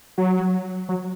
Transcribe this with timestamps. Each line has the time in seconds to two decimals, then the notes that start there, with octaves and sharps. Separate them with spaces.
0.18 F#3
0.89 F#3